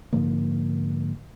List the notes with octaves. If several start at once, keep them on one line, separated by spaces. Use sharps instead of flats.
G#2 D3 F3 A#3